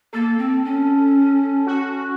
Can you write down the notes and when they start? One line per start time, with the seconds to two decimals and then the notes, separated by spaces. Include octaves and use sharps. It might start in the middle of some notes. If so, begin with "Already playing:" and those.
0.13 A#3 A4
0.38 C4
0.65 C#4
1.67 F#4